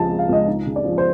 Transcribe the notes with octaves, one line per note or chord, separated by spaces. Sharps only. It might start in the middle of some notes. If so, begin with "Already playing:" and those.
Already playing: C#2 C#3 F3 A5
G#3
F5
C#2 D#5
D#4
C#3
D5
F3
C5